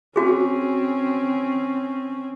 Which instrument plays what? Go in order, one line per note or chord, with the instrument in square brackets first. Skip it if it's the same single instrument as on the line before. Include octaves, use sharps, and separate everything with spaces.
[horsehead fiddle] C4 C#4 [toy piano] F#4 G#4